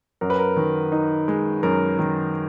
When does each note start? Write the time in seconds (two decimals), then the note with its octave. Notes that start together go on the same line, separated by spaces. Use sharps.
0.21 F#2 A#4
0.30 B4
0.39 A#4
0.56 D#3
0.92 D#4
1.28 G#3
1.63 F#2 A#4
1.99 D#3